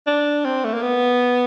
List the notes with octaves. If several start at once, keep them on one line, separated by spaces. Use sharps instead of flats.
D4
C4
A3
A#3
B3